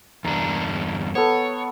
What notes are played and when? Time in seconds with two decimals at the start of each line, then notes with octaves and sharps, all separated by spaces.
0.25 E2 G2 D4 A#5
1.15 B3 A4 C#5